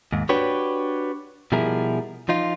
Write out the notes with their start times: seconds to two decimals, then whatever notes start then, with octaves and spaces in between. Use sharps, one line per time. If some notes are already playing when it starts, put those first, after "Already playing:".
0.13 D#2 G#2
0.29 D4 F#4 G4 B4 C#5
1.52 B2 F3 G3 E4 G#4 A#4
2.29 F3 D#4 F4